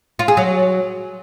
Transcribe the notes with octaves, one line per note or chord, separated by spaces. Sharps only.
F4
G#4
F#3